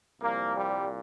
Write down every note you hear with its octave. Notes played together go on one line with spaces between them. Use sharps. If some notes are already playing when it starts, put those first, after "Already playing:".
C2 A#2 F3 A#3
G3